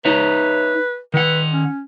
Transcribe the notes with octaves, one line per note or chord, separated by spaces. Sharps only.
D#4 B4 C#5 E5
D#3 B4 F#5
C#4